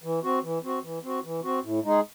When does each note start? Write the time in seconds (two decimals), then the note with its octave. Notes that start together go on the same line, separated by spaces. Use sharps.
0.04 E3
0.23 C4 F#4
0.43 E3
0.63 C4 F#4
0.83 E3
1.03 C4 F#4
1.24 E3
1.43 C4 F#4
1.64 A2
1.84 G#3 D#4 G#4